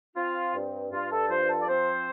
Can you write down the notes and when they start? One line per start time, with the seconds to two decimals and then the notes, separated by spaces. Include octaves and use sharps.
0.15 C4 F4
0.53 G2
0.91 G2 F4
1.10 A4
1.29 F3 C5
1.48 A4
1.60 D5
1.67 C4 C5